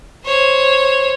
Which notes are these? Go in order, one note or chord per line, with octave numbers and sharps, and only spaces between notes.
C5 C#5